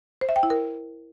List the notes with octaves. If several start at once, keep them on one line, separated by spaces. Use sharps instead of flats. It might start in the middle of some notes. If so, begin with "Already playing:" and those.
C5
E5
G5
E4
A#4